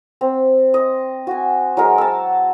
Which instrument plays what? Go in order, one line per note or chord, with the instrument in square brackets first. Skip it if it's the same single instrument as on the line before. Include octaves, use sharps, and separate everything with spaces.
[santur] C4
D#5
F#4 G#5
F#3 G#3 A#4
A5 E6